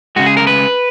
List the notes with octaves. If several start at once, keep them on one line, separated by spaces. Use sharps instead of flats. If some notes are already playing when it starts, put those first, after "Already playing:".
C#3 G#3 F#4
G#4
A#4
B4